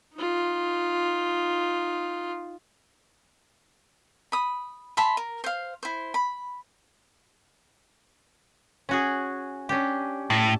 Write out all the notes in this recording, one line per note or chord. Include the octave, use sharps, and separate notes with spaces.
D#4 F4
B5 D#6
E5 A5 B5 C6
A#4
C5 F5
E4 C5
B5
C#4 F#4 G#4
C#4 D4 G4
A2 A5